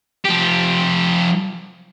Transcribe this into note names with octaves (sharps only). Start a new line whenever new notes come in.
F3 G4